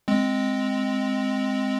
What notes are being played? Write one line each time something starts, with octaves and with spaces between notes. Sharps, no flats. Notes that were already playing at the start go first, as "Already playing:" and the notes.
G#3 C4